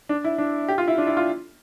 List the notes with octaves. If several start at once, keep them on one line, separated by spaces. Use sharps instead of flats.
D4
E4
D4
G4
F4
E4
D4
E4
F4